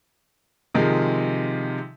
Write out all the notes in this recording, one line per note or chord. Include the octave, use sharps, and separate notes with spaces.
C3 D#3 F3 G#3